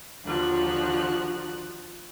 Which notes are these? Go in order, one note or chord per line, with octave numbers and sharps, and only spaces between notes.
D#2 D3 F3 F#4 F#6